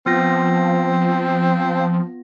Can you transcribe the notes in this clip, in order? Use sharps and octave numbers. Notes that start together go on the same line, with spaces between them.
F3 B3 C4 F4 A#6